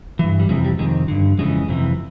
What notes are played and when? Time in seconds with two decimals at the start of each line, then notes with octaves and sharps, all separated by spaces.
0.19 G2 E3
0.39 G3
0.49 F2 C3 E3 G#3
0.64 G3
0.79 F2 C3 D#3 G#3
1.08 G2 D3
1.38 F2 C#3 E3 G#3
1.68 F2 C3 E3